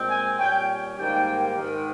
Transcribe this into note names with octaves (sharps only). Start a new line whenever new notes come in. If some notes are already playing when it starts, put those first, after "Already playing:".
Already playing: A#2 G#3 C4
G#5
A#2 G3 C#4 G5
G#2 D#3 G3 A#3 G5
G#2 D#3 G#3